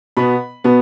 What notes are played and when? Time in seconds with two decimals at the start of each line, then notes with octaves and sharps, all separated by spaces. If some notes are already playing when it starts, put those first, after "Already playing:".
0.17 B2 B3 B5
0.64 B2 B3